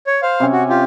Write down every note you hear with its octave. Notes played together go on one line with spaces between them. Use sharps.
C#5
C5 F5
C3 C#4 G#5
F#4
F4 G4